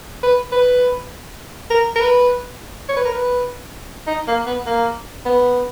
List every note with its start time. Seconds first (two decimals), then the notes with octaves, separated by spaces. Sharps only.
0.23 B4
0.52 B4
1.70 A#4
1.95 A#4
2.01 B4
2.89 C#5
2.97 B4
3.05 A#4
3.13 B4
4.07 D#4
4.28 A#3
4.46 B3
4.66 A#3
5.25 B3